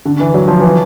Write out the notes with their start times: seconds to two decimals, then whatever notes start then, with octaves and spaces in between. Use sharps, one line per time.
0.05 D3
0.20 E3
0.34 F#3
0.48 F3
0.61 E3